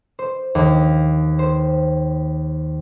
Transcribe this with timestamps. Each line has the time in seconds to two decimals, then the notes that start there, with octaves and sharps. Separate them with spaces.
0.19 C5
0.55 D#2
1.39 C5